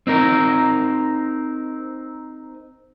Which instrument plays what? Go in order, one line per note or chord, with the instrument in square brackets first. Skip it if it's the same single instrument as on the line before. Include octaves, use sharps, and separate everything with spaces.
[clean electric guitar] C4 D#4 A#4